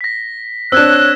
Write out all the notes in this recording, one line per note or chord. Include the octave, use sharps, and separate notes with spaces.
A#6 B6
C4 D4 C#5 E6 F#6 G#6 E7